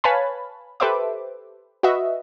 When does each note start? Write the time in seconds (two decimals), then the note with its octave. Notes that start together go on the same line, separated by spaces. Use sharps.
0.04 B4 C#5 F5 G#5 A5 B5
0.80 G4 A4 B4 C5 E5 D6
1.83 F#4 B4 D#5 E5